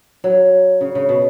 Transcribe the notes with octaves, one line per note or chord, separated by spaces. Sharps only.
F#3
C#3
C#3
B2